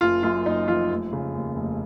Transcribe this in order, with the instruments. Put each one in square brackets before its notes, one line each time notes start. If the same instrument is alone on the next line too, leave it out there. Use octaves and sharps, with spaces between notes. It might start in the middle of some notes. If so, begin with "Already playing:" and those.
[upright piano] F#1 F4
F#2 F4
F#1 D#4
F3 F4
F1
C#3
D#2
F1